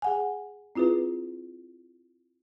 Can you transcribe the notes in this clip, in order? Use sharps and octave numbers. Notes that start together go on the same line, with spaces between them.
G#4 F#5 G#5
C4 E4 F4 G#4 B4